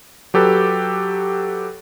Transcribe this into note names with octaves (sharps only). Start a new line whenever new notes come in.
F#3 G4 A4 B4